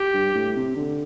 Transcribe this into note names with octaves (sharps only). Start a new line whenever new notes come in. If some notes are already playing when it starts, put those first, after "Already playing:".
Already playing: G4
G2
A2
C3
D3